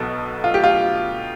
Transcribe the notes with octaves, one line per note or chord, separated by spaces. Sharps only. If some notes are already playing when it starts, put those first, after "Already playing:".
Already playing: B1 B2 A4
F4
G4
F4